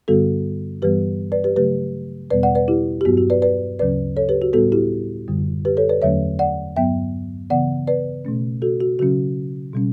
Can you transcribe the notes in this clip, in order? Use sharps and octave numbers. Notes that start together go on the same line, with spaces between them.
G2 D3 G3 B3 F#4 A4
G2 E3 G3 B3 G4 B4
B4 D5
G4 B4
C#3 F#3 A3 G4 B4
E2 B2 G3 B3 B4 D5
D5 F#5
B4 D5
E4 G4
G4
G2 F#3 B3 F#4
F#4
B4 D5
B4 D5
D2 C#3 F#3 C#4 B4 D5
A4 C#5
G4 B4
F#4
A2 G3 B3 F#4 A4
E4 G4
F#2 D3 G3
G4 B4
A4 C#5
B4 D5
E2 D3 F#3 A3 C#4 C#5 E5
D5 F#5
G2 F#3 B3 E5 G5
C#3 E3 B3 D5 F#5
B4 D5
B2 A3 C#4
F#4 A4
F#4
C#3 F#3 C#4 F#4
B2 G3 C#4